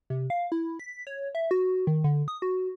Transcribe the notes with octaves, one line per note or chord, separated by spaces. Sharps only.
C3
F5
E4
B6
C#5
E5
F#4
D#3
D3
D#6
F#4